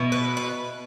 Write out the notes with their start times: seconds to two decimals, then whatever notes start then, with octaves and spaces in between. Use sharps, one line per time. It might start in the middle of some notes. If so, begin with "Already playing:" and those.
Already playing: B2 B3 E4
0.12 B4
0.37 B4